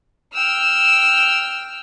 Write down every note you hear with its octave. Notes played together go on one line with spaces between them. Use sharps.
G5 E6 F6